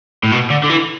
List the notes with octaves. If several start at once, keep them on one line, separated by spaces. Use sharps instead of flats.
A2
B2
D3
D3
E3